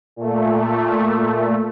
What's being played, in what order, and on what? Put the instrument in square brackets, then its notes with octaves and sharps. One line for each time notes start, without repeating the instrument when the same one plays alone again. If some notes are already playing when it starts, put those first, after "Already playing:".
[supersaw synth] A#2 A3